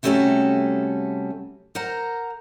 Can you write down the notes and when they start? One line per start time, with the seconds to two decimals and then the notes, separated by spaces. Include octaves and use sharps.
0.03 C3 G3 A3 C#4 F#4 A4
1.75 A#4 C5 F#5 A#5